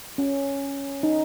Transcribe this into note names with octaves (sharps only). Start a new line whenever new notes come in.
C#4
D#4